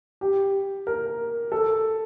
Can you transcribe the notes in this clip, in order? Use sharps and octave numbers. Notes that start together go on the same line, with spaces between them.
G4
A#4
A4